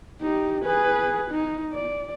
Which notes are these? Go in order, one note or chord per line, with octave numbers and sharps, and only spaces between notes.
D#4 G4
G#4 B4
D#4
D5